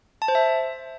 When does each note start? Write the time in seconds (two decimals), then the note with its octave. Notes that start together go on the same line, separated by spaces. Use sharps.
0.22 A5
0.28 C5
0.35 E5